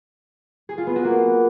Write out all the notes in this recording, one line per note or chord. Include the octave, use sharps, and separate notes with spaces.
G#4
F4
B3
F#4
A#3